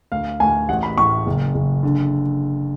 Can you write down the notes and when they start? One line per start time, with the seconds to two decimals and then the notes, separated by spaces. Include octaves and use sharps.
0.12 D2 F5
0.40 D2 G#5
0.69 A1 F#5
0.83 B5
0.98 A2 C#6
1.26 F#1
1.55 F#1
1.83 D3